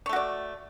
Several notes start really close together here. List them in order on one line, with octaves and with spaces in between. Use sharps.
C#5 A3 F#4 D5